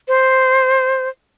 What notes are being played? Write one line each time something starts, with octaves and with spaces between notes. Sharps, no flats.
C5